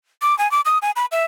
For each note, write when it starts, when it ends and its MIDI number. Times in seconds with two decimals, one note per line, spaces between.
0.22 0.37 86
0.39 0.50 80
0.51 0.61 86
0.65 0.78 87
0.82 0.91 80
0.96 1.06 83
1.12 1.25 76